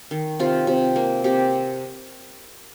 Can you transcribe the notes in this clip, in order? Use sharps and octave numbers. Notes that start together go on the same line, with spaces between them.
D#3
C3 F4
C3
A#3
C3 G4